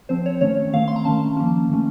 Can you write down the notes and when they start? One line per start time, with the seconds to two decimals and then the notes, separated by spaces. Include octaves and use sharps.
0.09 F3 C4 C5
0.26 C#5
0.41 D#3 A3 C#4 C#5
0.73 D#3 A3 C4 F5
0.88 C6
0.96 A#5
1.05 D#3 A3 C#4 A5
1.37 F3 A#3 C#4
1.70 D#3 A3 C#4